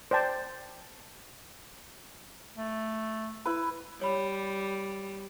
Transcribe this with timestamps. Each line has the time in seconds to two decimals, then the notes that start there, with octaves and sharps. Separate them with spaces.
0.11 C5 D5 G5 A5
2.57 A3
3.45 E4 B4
4.01 G3 C#5 B5